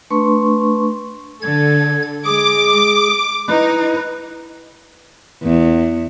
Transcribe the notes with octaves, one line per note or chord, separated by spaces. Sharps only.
A3 D4 B4 C6 C#6
D3 A4 G#6
G#3 G#4 D6
D#4 E4 B4
E2